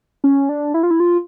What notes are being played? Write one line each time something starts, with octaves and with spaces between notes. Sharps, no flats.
C#4
D4
E4
F4
E4
F4